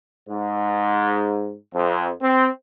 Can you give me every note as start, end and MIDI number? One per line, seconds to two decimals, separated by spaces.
0.28 1.53 44
1.74 2.10 41
2.22 2.47 60